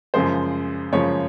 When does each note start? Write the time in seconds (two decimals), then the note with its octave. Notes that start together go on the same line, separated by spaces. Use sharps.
0.14 F#2 C#3 F3 G#3 C5
0.92 F#2 C#3 F3 G#3 C#5